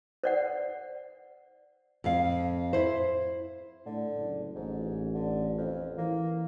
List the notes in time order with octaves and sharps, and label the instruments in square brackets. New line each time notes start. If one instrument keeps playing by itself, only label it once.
[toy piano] C5 D5 F#5
[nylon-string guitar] F2 F5
E4 C5
[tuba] A2 [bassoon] D3
[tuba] F#1
[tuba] A1 [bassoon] G#2
[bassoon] D3
F2
[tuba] E3 [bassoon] A#3